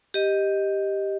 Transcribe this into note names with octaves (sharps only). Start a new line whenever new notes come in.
G4 D#5